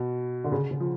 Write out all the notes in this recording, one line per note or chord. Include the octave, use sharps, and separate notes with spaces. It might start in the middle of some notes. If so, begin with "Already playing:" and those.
Already playing: B2
D3
C#3
C#3
F3